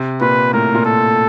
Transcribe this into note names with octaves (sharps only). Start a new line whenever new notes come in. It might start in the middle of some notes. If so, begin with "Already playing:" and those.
Already playing: C3
A#2 B4
A2 A#4
A#2
A4